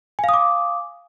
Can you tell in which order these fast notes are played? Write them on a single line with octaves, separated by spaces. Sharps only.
G#5 F5 D#6 D6